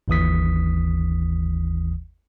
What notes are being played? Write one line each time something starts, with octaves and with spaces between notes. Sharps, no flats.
G1 D#2 E3 D#6 B6